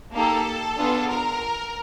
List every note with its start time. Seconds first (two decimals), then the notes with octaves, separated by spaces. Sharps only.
0.15 A#3 D#4 G4 A4
0.78 B3 D4 F4 G#4
1.09 A#4